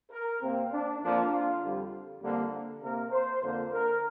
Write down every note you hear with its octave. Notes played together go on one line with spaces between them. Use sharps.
A#4
C3 A#3 C4
D4
F2 F3 A#3 D4
F4
F2 D3 G3
F2 D3 G3 A#3
C3 A#3 A#4
C5
F2 D3 F3 A#3 C5
A#4